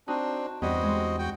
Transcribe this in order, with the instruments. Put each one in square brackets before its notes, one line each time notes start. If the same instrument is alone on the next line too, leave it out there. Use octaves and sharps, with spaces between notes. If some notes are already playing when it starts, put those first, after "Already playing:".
[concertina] C4 D4 [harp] D#4 F#4
[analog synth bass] E2 [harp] G2 [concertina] C4 F#4 D#5
[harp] G#3
[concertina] F#4 G5